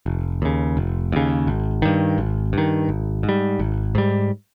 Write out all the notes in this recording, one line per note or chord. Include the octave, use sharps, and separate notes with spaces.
F1
D#2 C#3
F1
D#2 C#3
G#1
G2 D#3
G#1
G2 D#3
G#1
G#2
G3
G#1
G#2 G3